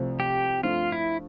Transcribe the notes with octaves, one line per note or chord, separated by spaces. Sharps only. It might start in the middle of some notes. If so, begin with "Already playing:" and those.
Already playing: C2 C3 F3 A3 C4
G4
G2 F3 A3 C4 F4
E4